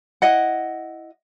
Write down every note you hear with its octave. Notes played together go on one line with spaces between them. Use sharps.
E4 D#5 F#5